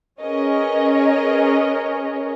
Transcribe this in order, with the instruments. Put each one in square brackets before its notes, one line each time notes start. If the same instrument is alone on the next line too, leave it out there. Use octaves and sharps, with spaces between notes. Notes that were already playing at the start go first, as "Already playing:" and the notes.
[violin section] C#4 G#4 A#4 B4 C#5 D#5